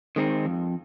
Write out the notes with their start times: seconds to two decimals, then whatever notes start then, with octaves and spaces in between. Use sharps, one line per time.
0.16 D#3 G#3 C4 D#4
0.45 F2